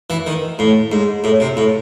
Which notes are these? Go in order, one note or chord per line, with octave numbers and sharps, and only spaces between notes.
E3
D#3
A2
G#2
A2
C3
A2